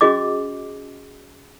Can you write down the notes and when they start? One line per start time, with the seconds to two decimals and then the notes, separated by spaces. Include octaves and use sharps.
0.01 C#4 F#4 G#4 D#5 D6